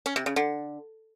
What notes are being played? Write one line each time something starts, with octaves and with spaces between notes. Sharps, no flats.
C#4
C3
C#3
D3